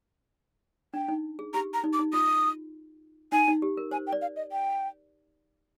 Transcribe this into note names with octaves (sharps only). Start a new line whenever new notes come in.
D4 G5
D#4
G#4
G4 A#5
A#5
D#4
D6
D#4
F4 D#6
D#4 G#5
D#4
G4
A#4
C5 G#5
G5
D5
F5
D#5
G5